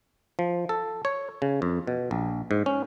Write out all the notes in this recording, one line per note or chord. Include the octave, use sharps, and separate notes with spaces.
F3
A4
C#5
C#3
F2
B2
A#1
G#2
C#4